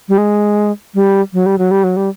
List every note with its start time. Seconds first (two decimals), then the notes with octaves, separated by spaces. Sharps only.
0.09 G3
0.18 G#3
0.95 G3
1.33 F#3
1.46 G3
1.58 F#3
1.71 G3
1.84 F#3
1.97 G3